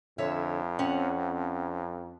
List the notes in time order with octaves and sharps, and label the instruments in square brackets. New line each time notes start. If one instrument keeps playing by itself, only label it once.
[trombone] F2 [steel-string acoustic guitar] D3 C#5 E5
[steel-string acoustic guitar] C4 C#4 F#5